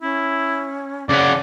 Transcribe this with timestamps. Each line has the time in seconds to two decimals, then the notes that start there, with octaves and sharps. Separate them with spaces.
0.01 C#4 E4
1.09 C#3 C#5 D5 F#5